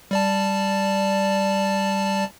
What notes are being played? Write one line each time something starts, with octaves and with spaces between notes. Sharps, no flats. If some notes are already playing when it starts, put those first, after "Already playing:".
G3 D5 A5